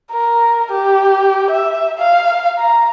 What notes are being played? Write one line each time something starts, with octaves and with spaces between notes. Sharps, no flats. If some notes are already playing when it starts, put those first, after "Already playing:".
A#4
G4
E5
F5
A#5